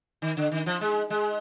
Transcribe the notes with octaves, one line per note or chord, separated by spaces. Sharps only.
D#3
D3
D#3
F3
G#3
G#3